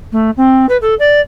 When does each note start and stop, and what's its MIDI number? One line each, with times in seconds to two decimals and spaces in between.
0.12 0.30 57
0.37 0.66 60
0.69 0.77 71
0.81 0.94 69
0.99 1.20 74